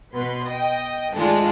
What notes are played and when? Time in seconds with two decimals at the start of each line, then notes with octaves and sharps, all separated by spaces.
0.15 B2 B4 C6
0.48 D#5 G5
1.13 G#2 D#3 G#3 A3 D4 F4